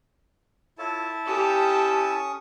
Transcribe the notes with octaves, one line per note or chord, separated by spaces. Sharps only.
E4 F4 A4 C#5 A5
C#4 G4 A4 C#6 D#6